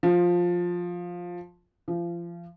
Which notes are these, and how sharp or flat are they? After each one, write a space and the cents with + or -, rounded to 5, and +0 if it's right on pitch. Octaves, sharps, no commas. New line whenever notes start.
F3 +10
F3 -30